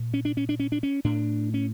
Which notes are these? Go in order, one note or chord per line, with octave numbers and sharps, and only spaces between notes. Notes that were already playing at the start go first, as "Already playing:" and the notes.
Already playing: A#2
C#4
D4
C#4
D4
C#4
D4
C#4
A2 D4
C#4